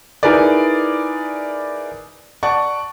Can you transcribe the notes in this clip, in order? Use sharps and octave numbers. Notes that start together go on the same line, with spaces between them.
D#4 E4 G#4 A#4 B4 D5
D5 F#5 A5 C#6